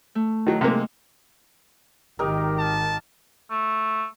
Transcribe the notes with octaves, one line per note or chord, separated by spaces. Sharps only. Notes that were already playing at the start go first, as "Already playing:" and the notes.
A3
D#3 F#3
C3 G#3 A#3 D#4
G#1 D#3 D#4 G4 A#4
A5
A3